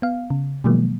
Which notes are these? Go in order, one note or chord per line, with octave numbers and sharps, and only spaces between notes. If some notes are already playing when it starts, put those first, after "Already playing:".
B3 F5
C#3
B2 D#3 F3 F#3 G#3 A#3